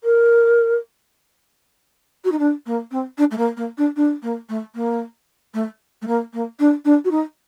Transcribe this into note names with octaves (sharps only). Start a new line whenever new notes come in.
A#4
F#4
D#4
D4
A#3
C4
D4
A3
A#3
A#3
D4
D4
A#3
A3
A#3
A3
A3
A#3
A#3
D4
D4
F#4
D#4